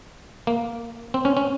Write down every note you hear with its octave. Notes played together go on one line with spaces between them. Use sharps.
A#3
C4
C#4
C#4